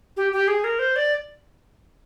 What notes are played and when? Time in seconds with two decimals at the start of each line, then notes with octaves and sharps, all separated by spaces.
0.17 G4
0.33 G4
0.48 G#4
0.64 A#4
0.79 C5
0.96 D5